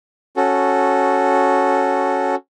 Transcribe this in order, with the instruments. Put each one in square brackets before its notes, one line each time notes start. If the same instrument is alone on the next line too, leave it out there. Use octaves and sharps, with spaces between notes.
[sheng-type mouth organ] C#4 F#4 A4